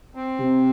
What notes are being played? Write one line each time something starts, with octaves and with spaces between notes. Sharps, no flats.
C4
C3